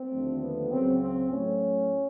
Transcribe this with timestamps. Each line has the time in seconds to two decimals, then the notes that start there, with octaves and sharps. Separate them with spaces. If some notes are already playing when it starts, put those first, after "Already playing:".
Already playing: C4
0.11 D#2 D3 F3 A3
0.41 B3
0.70 C#2 C#3 F#3 C4
1.00 C4
1.29 A2 F#3 A3 C#4